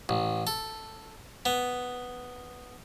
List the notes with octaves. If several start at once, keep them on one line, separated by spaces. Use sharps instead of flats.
A1
A4
B3